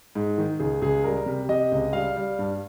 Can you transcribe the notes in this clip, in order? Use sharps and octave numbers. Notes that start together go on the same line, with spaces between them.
G#2
D#3
C#2 G#4
C#2 G#4
G3 A#4
C3
C3 D#5
C#2
G3 F5
G3
G2